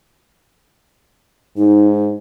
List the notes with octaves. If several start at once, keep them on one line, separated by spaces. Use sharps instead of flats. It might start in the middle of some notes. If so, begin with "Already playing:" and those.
G#2 D#4